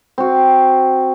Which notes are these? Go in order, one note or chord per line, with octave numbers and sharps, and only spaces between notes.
C4 F#4